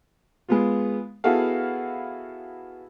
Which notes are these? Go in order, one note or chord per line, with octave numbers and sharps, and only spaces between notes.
G#3 B3 F4
B3 E4 F#4 G#4 A4 F5